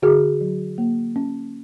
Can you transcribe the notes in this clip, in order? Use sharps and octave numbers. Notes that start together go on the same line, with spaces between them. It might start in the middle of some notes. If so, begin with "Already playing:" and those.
D3 F#4 G#4
F#3
A#3
C#4